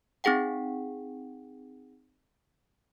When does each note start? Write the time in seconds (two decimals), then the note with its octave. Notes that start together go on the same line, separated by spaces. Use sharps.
0.24 C4 D#4 G#4 F#5 G5